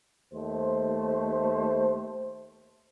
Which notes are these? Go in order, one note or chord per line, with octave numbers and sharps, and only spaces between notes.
D#2 A3 C5